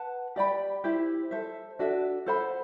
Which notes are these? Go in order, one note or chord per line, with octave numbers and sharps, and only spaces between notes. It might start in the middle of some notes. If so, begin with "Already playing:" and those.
Already playing: B4 F#5 A5
G4 D5 G5 B5
E4 G4 C5
A4 C5 E5
D4 F#4 A4 E5
A4 C5 F#5 B5